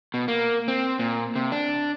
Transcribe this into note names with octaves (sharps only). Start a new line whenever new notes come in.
B2
A#3
C4
A#2
C3
D4